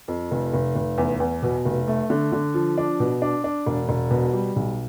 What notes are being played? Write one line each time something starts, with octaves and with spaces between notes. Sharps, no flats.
F2
F1
F1
F1
E2
E2
B2
F1
A3
D3
D3
F3
D4
B2
D4
D4
E1
E1
B2
G3
B1